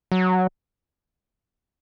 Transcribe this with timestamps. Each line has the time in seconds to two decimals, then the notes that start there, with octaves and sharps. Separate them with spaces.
0.12 F#3